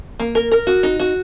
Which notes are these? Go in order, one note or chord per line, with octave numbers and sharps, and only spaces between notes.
A#3
A#4
A#4
F#4
D#4
F#4